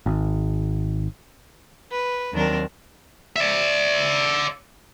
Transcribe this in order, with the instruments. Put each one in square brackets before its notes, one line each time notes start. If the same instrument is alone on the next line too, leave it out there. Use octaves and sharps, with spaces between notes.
[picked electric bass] G#1
[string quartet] B4
D#2 D#3 F#3 C4 D4 A#4
[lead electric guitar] D5 E5